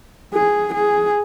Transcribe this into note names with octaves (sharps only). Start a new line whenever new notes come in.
G#4
G#4